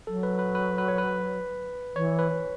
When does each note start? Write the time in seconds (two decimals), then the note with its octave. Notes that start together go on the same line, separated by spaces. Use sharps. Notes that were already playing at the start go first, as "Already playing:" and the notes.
0.07 F#3 A4
0.23 B4
0.39 B4
0.55 B4
0.78 B4
0.88 C#5
0.98 B4
1.95 E3 C#5
2.19 B4